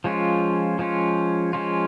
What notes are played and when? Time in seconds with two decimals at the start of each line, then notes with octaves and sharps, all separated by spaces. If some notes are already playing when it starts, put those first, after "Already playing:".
0.04 F3 G#3 C#4 F4
0.79 F3 G#3 C#4 F4
1.53 F3 G#3 C#4 F4